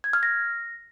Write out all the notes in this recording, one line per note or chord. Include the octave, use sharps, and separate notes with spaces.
G#6
F6
A#6